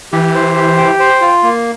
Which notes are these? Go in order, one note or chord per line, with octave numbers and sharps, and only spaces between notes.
E3 G4
C5
G4
G5
C5
F4
A#3